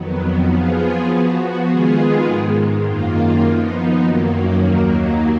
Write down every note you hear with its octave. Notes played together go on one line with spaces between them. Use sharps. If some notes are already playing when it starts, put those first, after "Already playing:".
Already playing: F2 D#3 F#3 B3
F3 B3 F4 G#4
F3 B3 F#4
D#3 G#3 B3 F4 G#4
G#2 D#3 G#3
F#2 D#3 A#3 F4
F3 B3 D#4
F#2 D#3 F#3 A#3
D#2 D#3 F#3 A#3